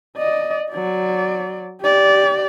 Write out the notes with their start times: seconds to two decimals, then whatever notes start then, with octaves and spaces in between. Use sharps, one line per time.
0.18 D5 D#5
0.71 F#3 D5
1.82 G4 D5